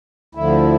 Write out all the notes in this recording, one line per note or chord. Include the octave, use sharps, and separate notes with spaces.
D2 D3 F3 E4